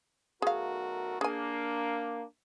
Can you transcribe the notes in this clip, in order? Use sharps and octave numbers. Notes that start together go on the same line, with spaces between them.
B1 A3 F#4 G#4 A#4 F5
A#3 D4 G#4 G#5